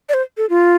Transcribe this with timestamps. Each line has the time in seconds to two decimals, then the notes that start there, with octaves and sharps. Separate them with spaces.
0.09 D5
0.14 C5
0.37 A4
0.50 F4